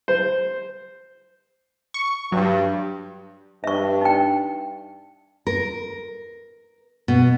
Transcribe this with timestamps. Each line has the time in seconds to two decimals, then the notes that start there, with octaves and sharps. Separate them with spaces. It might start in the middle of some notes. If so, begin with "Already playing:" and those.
0.08 C5
1.94 C#6
2.32 G2 F#3
3.64 G2 E5 C#6
4.01 D#4 G5
5.47 A#4
7.08 B2